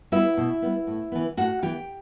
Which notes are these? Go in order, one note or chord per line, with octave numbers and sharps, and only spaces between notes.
G3 B3 E4 E5
B2
G3 B3
A2
E3 B3
A2 F#4 F#5
E3 B3 G4 G5